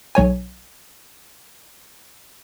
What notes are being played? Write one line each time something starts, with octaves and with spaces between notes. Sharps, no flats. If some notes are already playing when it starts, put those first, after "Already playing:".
B1 C#5 G#5